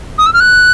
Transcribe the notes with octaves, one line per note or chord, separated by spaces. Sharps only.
D#6
E6
F6
F#6